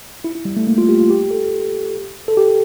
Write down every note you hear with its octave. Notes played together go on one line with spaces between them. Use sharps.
E4
E4
G3
A3
A#3
F4
G4
F4
G4
A4
A4
G4